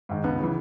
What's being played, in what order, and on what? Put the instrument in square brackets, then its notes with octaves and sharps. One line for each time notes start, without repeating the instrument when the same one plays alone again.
[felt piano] G#2 D#3
C#2 B3
C#3 E3